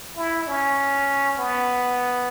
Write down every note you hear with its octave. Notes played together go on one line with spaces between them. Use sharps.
E4
C#4
B3